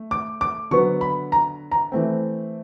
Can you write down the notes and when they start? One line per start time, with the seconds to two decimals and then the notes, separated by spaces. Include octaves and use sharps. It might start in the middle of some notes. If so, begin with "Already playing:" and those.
Already playing: A3
0.11 D6
0.41 D6
0.71 D3 F#3 B3 C#6
1.01 B5
1.32 A#5
1.71 A#5
1.92 E3 A3 C4